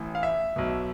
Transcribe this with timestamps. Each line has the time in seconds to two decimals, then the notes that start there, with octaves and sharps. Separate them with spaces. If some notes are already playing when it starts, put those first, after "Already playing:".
Already playing: A1 A2 E3
0.15 F5
0.23 E5
0.56 B1 B2